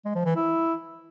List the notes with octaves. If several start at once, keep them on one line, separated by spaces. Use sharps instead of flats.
G#3
F3
E3
E4